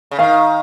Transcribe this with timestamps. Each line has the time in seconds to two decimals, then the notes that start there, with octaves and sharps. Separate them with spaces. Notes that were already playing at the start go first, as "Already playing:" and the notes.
0.11 C#3
0.19 D#3 F5